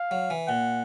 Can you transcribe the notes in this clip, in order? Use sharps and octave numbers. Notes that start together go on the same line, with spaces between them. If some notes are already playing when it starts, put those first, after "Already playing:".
Already playing: F5
F#3
E3
A#2 F#5